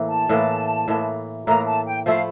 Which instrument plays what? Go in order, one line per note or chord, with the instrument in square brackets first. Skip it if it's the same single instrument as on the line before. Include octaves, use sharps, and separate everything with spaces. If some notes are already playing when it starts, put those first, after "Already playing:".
Already playing: [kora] A2 E3 A#3
[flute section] A5
[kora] A2 E3 A#3
A2 E3 A#3
[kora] A2 E3 A#3 [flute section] A#5
[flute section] A5
G5
[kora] F3 A3 E4 [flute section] F5